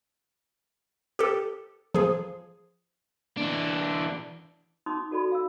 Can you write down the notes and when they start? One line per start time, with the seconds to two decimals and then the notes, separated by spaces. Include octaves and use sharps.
1.19 G4 A4
1.94 F3 G#4
3.37 E3 D4
4.86 C#4 D#4 C6 D6 D#6
5.11 F#4 A4 D5 B5
5.32 F5 E6